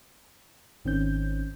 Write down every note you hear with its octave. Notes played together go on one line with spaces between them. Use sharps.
G#1 D#3 C4 C#4 G6